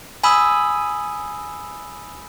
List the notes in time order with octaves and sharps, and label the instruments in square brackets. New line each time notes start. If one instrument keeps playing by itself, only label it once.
[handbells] G#5 B5 D#6 E6